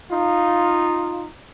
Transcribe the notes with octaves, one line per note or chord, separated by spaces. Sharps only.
D#4 F4